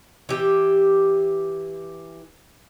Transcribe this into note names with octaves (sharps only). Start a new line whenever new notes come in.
E3 G4